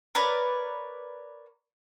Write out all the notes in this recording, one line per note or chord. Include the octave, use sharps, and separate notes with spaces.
A#4 B4 C#5 D5